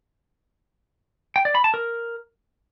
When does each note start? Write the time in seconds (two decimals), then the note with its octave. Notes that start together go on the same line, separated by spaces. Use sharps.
1.36 G5
1.45 D5
1.55 B5
1.64 A5
1.74 A#4